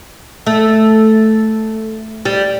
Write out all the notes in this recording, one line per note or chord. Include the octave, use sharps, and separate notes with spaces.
A3
G3